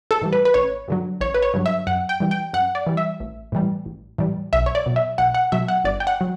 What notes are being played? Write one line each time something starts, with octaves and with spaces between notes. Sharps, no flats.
A4
A2 E3 G3
B4
B4
A1 C#5
G2 D3 F#3
A1 C#5
B4
C#5
G2 D3 F#3
E5
F#2 F#5
G5
E3 G3
G5
F#2 F#5
D5
E3 G3
E5
A1
A2 E3 G3
A1
A2 E3 G3
B1 E5
C#5
D5
B2 F#3
E5
B1 F#5
F#5
B2 F#3 E5
F#5
G1 D5
G5
F#5
F#3